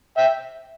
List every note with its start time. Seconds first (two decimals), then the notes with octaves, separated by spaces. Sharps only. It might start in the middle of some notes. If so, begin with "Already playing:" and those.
0.17 E5 G5